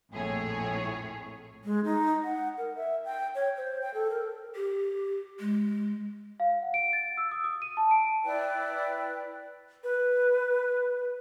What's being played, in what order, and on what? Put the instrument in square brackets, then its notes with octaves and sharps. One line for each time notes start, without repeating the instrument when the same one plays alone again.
[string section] A#1 F2 A2 G#4 C#5
[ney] G#3
D#4
F#5
A#4
E5
G5
C#5
C5
G5
A4
A#4
[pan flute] G4
G#3
[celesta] F5
F#5
D7
A6
E6
D#6
D#6
D#7
A5
D7
[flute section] E4 B4 D5 G5
[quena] B4